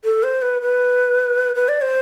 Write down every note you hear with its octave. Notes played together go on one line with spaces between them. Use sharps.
A4
C5
B4
B4
B4
D5
C5